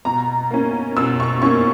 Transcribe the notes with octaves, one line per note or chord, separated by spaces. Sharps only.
B2 A#5
A#3 C#4
B2 E6
C#6
A#3 C#4 C#6